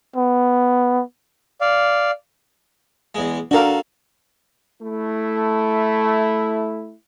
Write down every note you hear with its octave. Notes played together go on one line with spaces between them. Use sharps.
B3
D5 F5
E2 G#3
D4 F#4 A4 A#4 F5
A3 E4